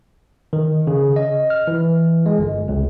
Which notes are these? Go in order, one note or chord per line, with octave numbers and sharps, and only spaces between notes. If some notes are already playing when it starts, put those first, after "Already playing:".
D#3
C#3
D#5
F6
E3
G#3
G1
C#2